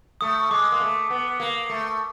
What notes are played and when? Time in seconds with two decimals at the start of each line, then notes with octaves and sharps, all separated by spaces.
0.21 A3 D#6
0.51 G#3 D6
0.72 A#3
0.80 A3
1.10 B3
1.40 A#3
1.69 A3